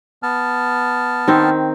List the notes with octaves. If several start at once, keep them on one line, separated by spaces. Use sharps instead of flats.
B3 A5 F6
D#3 C4